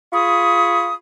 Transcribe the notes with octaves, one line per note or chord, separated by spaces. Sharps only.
F4 G#4 B5 C#6 D#6